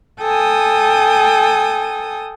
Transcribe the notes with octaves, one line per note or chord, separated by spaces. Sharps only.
A4 G5 G#5 D#6